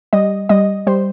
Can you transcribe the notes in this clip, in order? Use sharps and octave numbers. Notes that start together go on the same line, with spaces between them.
G3 D#5
G3 D#5
G3 C5